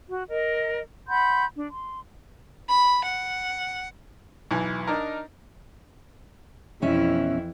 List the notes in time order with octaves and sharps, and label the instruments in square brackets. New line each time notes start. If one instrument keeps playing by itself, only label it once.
[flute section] F#4
A#4 D#5
F#5 B5 C6 G6
D4
C6
[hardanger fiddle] B5
F#5
[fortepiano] B1 E3 G#5
D4 D#4 A#4
[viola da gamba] F2 E3 E4 [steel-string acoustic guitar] B2 C#4 E5